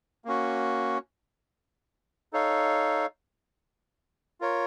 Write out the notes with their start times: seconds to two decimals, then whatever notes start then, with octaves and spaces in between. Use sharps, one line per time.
0.25 A#3 C#4 F#4
2.33 D#4 A4 C#5 F5
4.41 F4 A#4 C#5